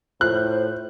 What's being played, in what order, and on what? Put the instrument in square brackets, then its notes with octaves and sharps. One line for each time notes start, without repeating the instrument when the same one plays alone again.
[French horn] A2 [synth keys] F4 [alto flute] C5 [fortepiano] F#6